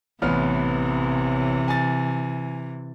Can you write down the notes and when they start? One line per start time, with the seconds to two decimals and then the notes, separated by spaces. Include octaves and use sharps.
0.22 A1 C3 E3 B3 F6
1.68 G#5 A6